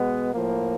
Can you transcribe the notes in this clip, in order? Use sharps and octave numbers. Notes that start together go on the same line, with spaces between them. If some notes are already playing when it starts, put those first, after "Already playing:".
Already playing: B2 G#3 B3
A2 F3 A#3